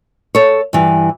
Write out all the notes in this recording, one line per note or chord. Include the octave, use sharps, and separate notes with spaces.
A4 C#5
G2 E3